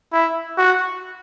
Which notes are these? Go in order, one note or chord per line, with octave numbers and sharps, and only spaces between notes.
E4
F#4